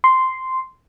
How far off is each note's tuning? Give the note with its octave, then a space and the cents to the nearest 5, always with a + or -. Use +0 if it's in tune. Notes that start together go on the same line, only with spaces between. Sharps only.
C6 -5